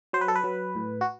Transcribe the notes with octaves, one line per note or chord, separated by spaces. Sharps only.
F#3 C5
B4
A4
B4
F#3
A2
F#4